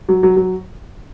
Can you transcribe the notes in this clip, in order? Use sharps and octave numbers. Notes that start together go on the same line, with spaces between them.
F#3
F#3
F#3